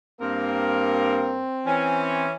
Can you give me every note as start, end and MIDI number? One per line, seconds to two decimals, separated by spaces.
0.21 1.42 43
0.21 1.42 58
0.21 2.26 60
0.21 1.42 70
1.66 2.33 52
1.66 2.33 61